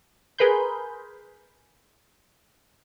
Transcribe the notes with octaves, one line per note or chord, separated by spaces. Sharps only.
G#4 A#4 B4 B5 C6 G6